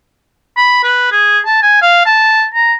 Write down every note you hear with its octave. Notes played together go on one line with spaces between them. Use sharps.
B5
B4
G#4
A5
G#5
F5
A5
A#5